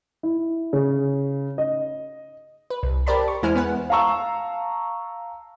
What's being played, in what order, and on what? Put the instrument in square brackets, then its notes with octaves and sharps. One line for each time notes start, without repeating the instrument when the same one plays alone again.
[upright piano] E4
C#3
D#5
[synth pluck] B4
C2
G4 A#4 C5 D5 A5 B5
C#6
E2 G#3 E4 C5 G#5 F6
B3 B4 F#5
[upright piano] F5 A5 A#5 C#6 E6